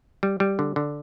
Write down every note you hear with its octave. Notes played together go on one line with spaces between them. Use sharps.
G3
G3
D3
D3